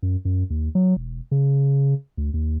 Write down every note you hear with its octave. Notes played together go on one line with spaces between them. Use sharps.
F#2
F#2
D#2
F#3
E1
C#3
D2
D#2